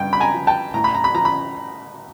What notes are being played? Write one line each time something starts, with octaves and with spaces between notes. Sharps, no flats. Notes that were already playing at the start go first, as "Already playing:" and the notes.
Already playing: G2 G5
B5
G#5 A#5
F3
G5 A5
A2 A#5
B5
A#5
B5
F3 A#5
B5